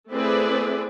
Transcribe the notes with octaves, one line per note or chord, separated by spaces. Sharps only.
A3 C4 E4 G#4 B4 D5